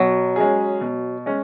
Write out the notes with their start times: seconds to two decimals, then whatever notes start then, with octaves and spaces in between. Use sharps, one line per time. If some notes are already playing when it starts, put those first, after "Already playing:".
Already playing: B2 F#3
0.36 G#3 C#4 G#4
0.81 B2
1.26 G#3 C#4